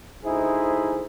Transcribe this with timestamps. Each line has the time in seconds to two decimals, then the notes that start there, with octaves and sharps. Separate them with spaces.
0.25 D2 D#4 E4 G#4 C5